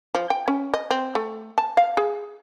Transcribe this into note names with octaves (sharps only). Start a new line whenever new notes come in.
F3
G5
C#4
D#5
C4
A3
A5
F5
G#4